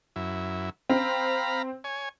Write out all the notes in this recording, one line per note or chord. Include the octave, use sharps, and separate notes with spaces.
F#2 E4
C4 F5 A#5 B5
C#5 G#5